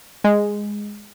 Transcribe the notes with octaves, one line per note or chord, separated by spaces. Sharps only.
G#3